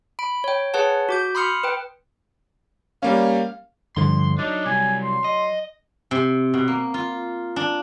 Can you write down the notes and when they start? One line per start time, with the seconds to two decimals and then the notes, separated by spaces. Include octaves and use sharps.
0.19 B5 D7
0.44 C#5 G5
0.74 G#4 B4 C#5 F#5 A5
1.09 F#4 D6 G6
1.35 B5 C6 D#6 F6 C#7
1.64 B4 G5
3.03 G3 A#3 C#4 F5
3.96 G2 D3 F3 C6
4.39 F#3 D4 D#4
4.66 C3 G3 G#5
5.03 C6
5.24 D#5
6.11 C3
6.54 B2
6.68 A#3
6.94 F4
7.56 D4